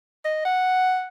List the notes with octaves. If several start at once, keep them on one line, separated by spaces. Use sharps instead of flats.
D#5
F#5